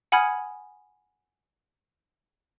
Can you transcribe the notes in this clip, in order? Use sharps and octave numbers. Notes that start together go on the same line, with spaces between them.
F#5 G#5 B5 D#6 F6 G#6